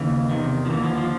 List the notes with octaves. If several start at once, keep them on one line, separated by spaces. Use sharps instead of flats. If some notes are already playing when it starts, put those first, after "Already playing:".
Already playing: D#2 C#3 E3
E2 C3 D#3
F3
D#2 D3 E3
F3
F3